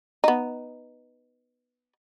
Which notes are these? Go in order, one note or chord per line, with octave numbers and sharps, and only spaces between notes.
B3 D#4